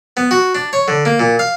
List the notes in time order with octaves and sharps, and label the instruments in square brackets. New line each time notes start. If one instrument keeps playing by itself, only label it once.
[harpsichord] B3
F#4
D4
C#5
D3
A#3
A#2
F5